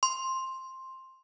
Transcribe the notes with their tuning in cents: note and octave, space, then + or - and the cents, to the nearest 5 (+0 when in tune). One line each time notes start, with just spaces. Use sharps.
C6 +10